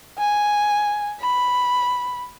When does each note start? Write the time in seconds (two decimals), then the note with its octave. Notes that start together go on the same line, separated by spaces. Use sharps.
0.19 G#5
1.21 B5